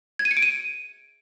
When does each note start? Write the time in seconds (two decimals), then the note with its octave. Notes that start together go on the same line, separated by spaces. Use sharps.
0.19 G#6
0.25 D#7
0.31 C#7
0.37 D7
0.42 D#7